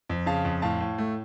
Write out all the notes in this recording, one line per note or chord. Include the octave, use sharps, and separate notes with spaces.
F2
C#3 F5 A5
F2
A2 F5 A5
A2
A3